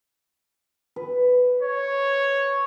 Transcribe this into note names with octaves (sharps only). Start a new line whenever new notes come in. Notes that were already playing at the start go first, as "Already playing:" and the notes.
B4
C#5